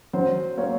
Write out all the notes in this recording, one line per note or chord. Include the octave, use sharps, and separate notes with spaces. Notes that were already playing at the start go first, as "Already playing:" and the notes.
F#3 C5
A#3 C#5